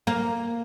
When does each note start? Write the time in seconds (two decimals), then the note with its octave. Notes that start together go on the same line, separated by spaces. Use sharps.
0.07 A#3